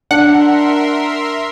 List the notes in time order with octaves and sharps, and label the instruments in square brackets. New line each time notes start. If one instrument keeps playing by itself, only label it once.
[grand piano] D4 [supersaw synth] A#4 E5 C6 [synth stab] F#5